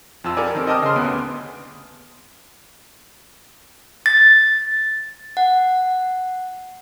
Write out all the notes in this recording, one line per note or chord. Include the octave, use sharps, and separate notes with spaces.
F2 F4 A5 E6
G4 A4 A#4 D5 G#5
D#3 C4
D#5 G5 A5 D6 D#6 F6
C#3 C6
D2 B3 D7
A6
F#5